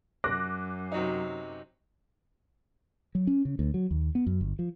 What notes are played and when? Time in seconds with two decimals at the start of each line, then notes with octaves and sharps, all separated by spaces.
0.24 F#2 D6 F#6 A#6
0.92 C3 F#3 D#4
3.15 F#3
3.27 C#4
3.45 C#3
3.59 D2
3.74 F#3
3.91 D#2
4.15 B3
4.26 F#2
4.41 G1
4.59 F3